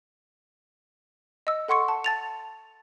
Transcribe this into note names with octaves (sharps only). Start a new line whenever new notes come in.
D#5 E6
A4 F#5 C6 C#6 C#7
A5
A5 A6 F7